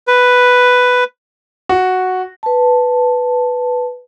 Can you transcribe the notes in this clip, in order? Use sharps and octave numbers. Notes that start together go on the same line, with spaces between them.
B4
F#4
B4 A5